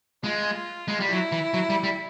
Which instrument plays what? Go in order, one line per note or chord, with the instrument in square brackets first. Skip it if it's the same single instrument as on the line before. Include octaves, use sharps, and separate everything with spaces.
[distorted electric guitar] G#3 [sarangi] F4
[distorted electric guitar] G#3
G3
[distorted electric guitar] F#3 [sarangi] E4
[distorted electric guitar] E3
F#3
G3
G3